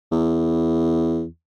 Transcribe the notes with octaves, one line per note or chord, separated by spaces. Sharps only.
E2